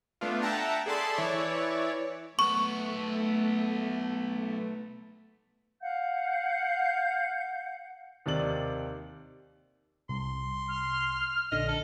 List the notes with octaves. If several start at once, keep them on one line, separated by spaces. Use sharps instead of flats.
A3 B3 D4 F4
E5 F#5 G5 A5 A#5
G#4 A4 D5 A5 B5 C6
E3 E4 C#5 D5
B1 A3 B3 C#6
F5 F#5 G6
D#2 C3 D5 F#7
C2 C6
F6
A#1 D3 D#5
A4